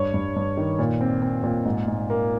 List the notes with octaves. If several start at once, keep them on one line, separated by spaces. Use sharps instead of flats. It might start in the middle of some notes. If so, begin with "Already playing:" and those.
Already playing: G2 C#5
G2
G2
D#3
A#2
C4
C4
A#2
G#2
G#2
A#3